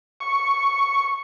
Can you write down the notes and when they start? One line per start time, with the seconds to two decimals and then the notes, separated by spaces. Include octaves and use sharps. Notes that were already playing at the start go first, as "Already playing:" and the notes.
0.20 C#6